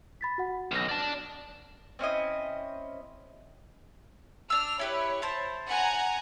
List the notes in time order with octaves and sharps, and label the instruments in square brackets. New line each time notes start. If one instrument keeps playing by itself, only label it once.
[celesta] B5 A6 B6
F#4 F#5
[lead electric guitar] B1 [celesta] F6 A#6
[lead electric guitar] D5 A5
[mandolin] C4 C#4 E4 D#5
[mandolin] D4 E6 [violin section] F6
[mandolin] E4 G4 B4 [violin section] C#5
[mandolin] E4 C5 A5
[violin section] F#5 G#5 A#5